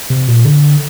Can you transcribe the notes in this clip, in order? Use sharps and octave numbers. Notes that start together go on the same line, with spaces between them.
C3
A#2
D3